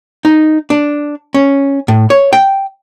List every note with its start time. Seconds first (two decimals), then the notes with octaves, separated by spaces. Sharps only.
0.25 D#4
0.70 D4
1.34 C#4
1.88 A2
2.10 C#5
2.33 G5